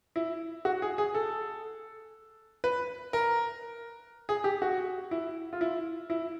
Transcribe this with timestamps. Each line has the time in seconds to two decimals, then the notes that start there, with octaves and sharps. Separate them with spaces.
0.16 E4
0.65 F#4
0.82 G#4
0.98 G#4
1.15 A4
2.64 B4
3.13 A#4
4.29 G#4
4.44 G4
4.62 F#4
5.11 E4
5.53 F4
5.61 E4
6.10 E4